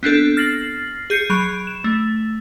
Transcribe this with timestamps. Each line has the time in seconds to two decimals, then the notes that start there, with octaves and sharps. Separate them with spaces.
0.03 B3 C4 D4 A4
0.37 F6 A6 A#6 C7 F#7
1.10 G#4 G6 C7 C#7
1.30 F#3 B5 D7
1.67 E7
1.84 A3